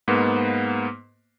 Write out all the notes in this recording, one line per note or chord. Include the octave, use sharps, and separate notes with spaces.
G#2 A#3 B3